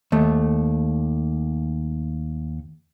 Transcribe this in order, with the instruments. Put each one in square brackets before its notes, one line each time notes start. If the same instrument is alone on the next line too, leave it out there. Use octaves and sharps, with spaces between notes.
[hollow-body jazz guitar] D#2 A3